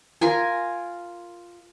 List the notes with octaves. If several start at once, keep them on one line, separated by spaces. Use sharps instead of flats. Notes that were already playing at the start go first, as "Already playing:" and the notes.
F4 A#4 G#5